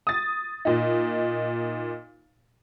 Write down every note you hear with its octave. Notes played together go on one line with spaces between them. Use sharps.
D#6 A6
A#2 D#4